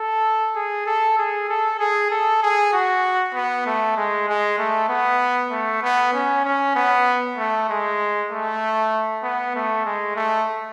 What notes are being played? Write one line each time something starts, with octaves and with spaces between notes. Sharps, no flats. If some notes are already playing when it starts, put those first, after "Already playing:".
Already playing: A4
G#4
A4
G#4
A4
G#4
A4
G#4
F#4
B3
A3
G#3
G#3
A3
B3
A3
B3
C#4
C#4
B3
A3
G#3
A3
B3
A3
G#3
A3